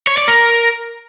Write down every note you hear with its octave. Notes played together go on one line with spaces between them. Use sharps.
C#5
D5
A#4